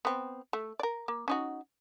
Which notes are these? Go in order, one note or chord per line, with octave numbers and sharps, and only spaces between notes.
B3 C4
A3
A#4 D5
A#3
C#4 D#4 F#4